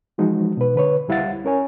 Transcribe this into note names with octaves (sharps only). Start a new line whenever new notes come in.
E3 F3 G#3 D#4 F#4
B2 B4
D3 B4 C#5
C#2 G3 E4 F5 F#5 A6
C#4 A#4 C#5 G#5